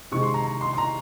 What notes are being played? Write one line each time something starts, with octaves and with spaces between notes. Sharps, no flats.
C3 D#3 G#3 C#6
C6
A#5
A#5
C6
C6
A#5